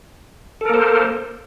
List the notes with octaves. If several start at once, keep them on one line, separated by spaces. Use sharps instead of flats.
A#3 A4 A#4 C5